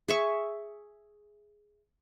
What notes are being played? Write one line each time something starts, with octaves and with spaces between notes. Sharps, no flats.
G#4 E5 C#6